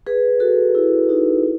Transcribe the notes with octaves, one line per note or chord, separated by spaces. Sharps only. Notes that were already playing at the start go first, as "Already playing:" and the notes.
G#4 B4
F#4 A4
E4 G#4
D#4 F#4
E4